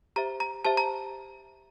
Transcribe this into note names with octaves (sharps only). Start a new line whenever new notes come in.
G4 C5 E5 A#5
A#5
G4 C5 E5 A5
A#5